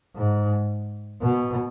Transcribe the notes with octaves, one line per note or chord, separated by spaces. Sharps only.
G#2
B2